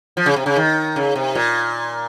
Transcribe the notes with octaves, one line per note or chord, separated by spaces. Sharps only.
F3
C#3
C3
C#3
D#3
C#3
C3
A#2